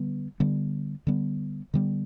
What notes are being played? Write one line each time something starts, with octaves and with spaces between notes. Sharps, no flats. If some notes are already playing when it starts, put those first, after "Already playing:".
Already playing: D3 G3 B3
D3 G3 B3
D3 G3 B3
D3 G3 B3